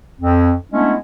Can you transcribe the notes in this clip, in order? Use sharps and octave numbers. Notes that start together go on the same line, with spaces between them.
F2 C4
G#3 A3 B3 C#4 D4 E4